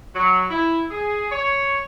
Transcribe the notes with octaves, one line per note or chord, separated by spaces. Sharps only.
F#3
E4
G#4
C#5